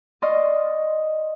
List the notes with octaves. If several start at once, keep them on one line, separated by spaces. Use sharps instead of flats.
D5 D#5 C6 C#6 F6